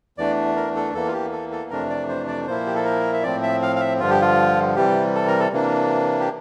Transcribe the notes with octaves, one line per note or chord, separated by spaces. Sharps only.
E2 E3 A3 D4 D5
A#4
A4
E2 E3 A#3 A4
F4
G4
A4
A4
F2 C3 E3 A3 D4 A#4
D5
C5
D5
A#2 F3 A#3 E4 C5
G4
A4
A#4
E5
A2 F3 C4 D5
E5
F5
F5
E5
G2 D3 F3 F4
G4
F4
C3 E3 G3 G4
A4
A#4
A4
C3 E3 A#3 D4
G4